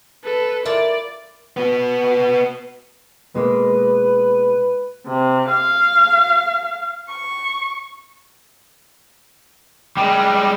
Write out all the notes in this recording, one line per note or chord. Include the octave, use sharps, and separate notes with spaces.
A4 B4
E4 F4 A#4 D5 A5
B3 F#4
B2 G#3 A#3 B4
C3
F5
C#6
G3 G#3